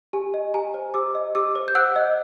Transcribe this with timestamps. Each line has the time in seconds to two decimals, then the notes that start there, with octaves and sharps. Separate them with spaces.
0.13 G4 G#5
0.34 D#5
0.54 G4 G#5 A#5
0.74 C5
0.94 G4 D6 E6
1.15 D#5
1.35 G4 D6 E6
1.55 C5
1.68 G6
1.75 F#5 E6 F#6
1.96 D#5